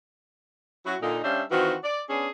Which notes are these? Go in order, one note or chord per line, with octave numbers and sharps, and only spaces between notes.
F#3 C#4 E4 F#4
A#2 D3 D#4
G3 C#4 D4 C5 E5 F5
D#3 E3 C4 F4 F#4
D5
B3 C#4 D4 G#4